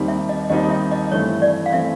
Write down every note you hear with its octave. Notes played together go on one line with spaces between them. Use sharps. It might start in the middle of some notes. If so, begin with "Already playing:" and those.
Already playing: D#2 D#3 G3 C4 D#4
E5
D#5
D#2 D#3 G3 C4 D#4 D#5
E5
D#5
G2 E3 A3 C4 C#5
D5
F5
E3 A3 C4 E5